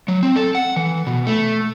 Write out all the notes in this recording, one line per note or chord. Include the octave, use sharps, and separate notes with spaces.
F#3
C4
A4
F#5
E3
B2
A3